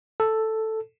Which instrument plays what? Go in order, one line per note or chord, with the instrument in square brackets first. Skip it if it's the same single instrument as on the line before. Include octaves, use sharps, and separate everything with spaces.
[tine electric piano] A4